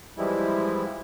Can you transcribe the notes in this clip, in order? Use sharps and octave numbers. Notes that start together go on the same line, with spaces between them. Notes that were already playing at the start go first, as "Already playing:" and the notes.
E3 F3 G3 G#3 E4